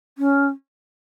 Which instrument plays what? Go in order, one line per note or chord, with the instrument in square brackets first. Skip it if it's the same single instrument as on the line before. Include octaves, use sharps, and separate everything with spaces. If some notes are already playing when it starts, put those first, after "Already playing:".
[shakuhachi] C#4